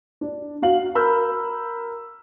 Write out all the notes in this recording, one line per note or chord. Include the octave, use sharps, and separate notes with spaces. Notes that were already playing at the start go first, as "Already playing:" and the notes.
D4
F#4 F5 F#7
A#4 B5 E6 F6 G6